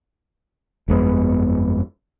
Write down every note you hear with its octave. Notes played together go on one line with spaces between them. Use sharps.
G1 F2 G#3 B3